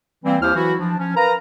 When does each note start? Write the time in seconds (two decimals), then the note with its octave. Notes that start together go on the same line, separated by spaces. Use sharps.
0.25 E3 G3 A#3 C4
0.41 D#2 E4 G4 C5 F5 F6
0.55 E3 F#3 E4 F#4
0.79 F3 D4
0.98 F3 C#4
1.16 A#4 B4 F5 A#5